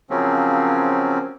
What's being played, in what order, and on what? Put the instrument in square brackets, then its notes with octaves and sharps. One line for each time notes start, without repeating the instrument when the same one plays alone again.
[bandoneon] C#3 F3 F#3 A#3 C4 C#4